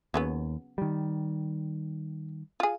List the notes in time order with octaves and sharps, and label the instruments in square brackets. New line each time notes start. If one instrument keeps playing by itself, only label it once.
[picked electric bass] D#2 [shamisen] C#3 F#3 B3
[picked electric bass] D#3 G3
[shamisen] F4 G#4